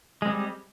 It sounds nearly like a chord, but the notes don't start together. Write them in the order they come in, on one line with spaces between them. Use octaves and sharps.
G#3 C4 G3